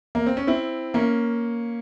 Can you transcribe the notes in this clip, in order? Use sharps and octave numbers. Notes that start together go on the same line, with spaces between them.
A#3
C4
C#4
C4 E4
A#3 C#4